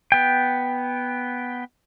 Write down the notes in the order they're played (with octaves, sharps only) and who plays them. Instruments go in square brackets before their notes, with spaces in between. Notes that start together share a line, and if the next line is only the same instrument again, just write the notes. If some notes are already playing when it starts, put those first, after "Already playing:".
[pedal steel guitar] B3 G5